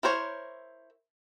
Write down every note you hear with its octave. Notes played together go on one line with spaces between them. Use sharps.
E4 A#4 C5 C#5